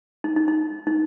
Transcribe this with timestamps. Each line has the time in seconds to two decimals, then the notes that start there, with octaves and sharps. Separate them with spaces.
0.24 D#4
0.36 D#4
0.48 D#4
0.87 D#4